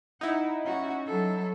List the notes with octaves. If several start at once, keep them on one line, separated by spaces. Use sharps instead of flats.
D#4 E4 F#5
C#4 F#4
F#3 A4